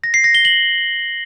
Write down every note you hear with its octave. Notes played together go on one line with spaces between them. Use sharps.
A#6
C7
A#6
G7
F#7